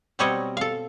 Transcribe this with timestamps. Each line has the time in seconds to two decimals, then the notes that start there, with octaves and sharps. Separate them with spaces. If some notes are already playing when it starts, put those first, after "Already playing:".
0.19 B2 F#3 G3 C4 C#5 D#5
0.57 A4 F5